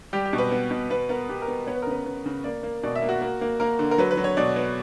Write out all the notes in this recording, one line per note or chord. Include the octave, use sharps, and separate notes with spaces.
G3 G4
G4
B2
B4
B3
B2
B3 B4
B3 A#4
B3 G4
A#4
B3
B3 C#5
B4
A#4
C#3 B4
B3
C#3
A#3 D5
A#3
B2 D5
E5
A#3
F#4
A#3
A#3
A#3 A#4
D3
A#4
F#3 B4
B4
F#3
C#5
B2 D5
B3